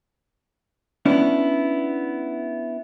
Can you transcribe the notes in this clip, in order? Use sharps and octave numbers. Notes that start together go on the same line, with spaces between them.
B3 C#4 D4 E4